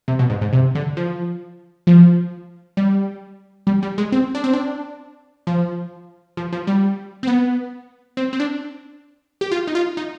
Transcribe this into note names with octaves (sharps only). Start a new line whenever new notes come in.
C3
B2
G#2
G#2
C3
D3
F3
F3
G3
G3
G3
G#3
C4
D4
C4
D4
F3
F3
F3
G3
C4
B3
C4
C4
D4
G4
F4
D#4
F4
D#4